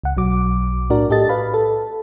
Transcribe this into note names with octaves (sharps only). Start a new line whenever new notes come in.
C#2 F#5
B1 F#3 D6
A2 D4 F#4 A#4 D5
A2 G4 A4 D#5 A6
B4 F5 B5
A4